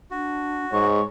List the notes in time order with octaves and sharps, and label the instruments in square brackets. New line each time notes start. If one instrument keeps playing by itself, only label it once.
[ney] D4 [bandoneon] F#4
[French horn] G#2 [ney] G#3 [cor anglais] C#5